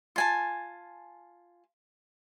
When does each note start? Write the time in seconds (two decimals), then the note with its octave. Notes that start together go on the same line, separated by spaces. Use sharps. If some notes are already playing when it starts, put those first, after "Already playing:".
0.16 F4 G#5 A5